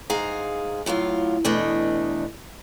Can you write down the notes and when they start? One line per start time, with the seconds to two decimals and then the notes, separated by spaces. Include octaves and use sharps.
0.10 G#2 G#4 F5 A#5
0.86 A2 F#3 F4 F5
1.45 E2 B2 A3 D4 D#5